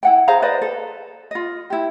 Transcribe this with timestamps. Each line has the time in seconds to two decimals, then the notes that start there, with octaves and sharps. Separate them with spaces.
0.03 E4 F#5 G5
0.28 G#4 C5 F5 A#5
0.42 B4 C5 D5 D#5
0.62 A4
1.31 F4 D#5
1.70 E4 G4